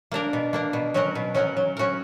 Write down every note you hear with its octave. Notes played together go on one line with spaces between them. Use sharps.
A#3 D4 A#4
B2
A#3 D4 A#4
B2
F#3 C#4 F#4 A#4
B2
F#3 C#4 F#4 A#4
F#3
C#4 F#4 A#4